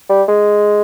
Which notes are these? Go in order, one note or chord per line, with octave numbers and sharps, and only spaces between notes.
G3
G#3